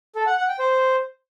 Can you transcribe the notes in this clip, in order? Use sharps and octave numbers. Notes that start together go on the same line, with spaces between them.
A4
F#5
F#5
G5
C5